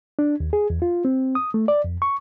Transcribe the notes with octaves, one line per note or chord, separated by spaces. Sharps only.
D4
D#2
G#4
E2
F4
C4
D#6
A3
D5
F2
C#6